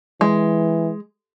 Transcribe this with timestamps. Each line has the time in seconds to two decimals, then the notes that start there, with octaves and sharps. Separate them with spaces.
0.21 E3 G#3